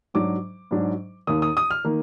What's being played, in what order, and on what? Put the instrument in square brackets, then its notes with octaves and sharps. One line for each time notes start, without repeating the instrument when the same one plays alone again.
[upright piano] G#2 F#3 D4 D6
G#2 F#3 D4
D#2 D#3 A#3 D#6
D#6
D#6
F6
D#3 A#3